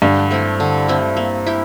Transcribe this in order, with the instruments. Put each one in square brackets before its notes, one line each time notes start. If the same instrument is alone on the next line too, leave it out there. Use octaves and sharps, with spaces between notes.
[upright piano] G2 [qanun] D3
[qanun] A3 C4 E4
D3
A3 C4 E4
A#3
E4 G4